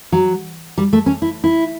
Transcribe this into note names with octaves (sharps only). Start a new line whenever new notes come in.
F#3
G3
A3
C#4
E4
E4